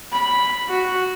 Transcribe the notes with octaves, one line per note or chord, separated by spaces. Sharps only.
B5
F#4